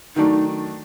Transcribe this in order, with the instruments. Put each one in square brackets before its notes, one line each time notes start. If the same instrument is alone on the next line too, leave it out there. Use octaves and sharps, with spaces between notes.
[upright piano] D#3 F#3 A3 D4 [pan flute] D#4